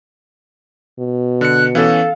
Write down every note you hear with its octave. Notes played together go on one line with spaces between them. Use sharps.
B2
D3 F#6 C#7
E3 B3 C#4 A4 F5